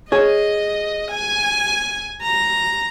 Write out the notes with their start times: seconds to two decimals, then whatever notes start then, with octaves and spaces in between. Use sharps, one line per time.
0.12 G#4 C#5 D#5
1.11 G#5
2.22 A#5